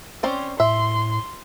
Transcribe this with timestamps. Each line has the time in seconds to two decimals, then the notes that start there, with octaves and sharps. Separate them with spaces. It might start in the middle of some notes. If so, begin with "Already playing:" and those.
0.23 C4 C#4 C5 D5
0.60 A2 E5 C6